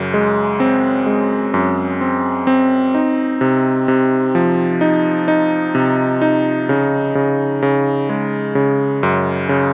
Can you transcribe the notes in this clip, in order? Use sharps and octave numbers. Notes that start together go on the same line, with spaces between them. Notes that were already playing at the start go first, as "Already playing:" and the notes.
Already playing: F#2 C#3
G#3
C4
G#3
F#2
C4
C4
D#4
C3
C3
F3
D#4
D#4
C3
D#4
C#3
C#3
C#3
G#3
C#3
F#2
C#3